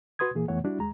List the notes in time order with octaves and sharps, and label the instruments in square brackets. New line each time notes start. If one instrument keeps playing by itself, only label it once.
[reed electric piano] F#4 B4 C6 D#6 G#6
A#2 E3 A#3 G#4
F2 E3 A3 B3 C#5 F#5
G3 D4 E4 F#4
D#2 G#3 A#5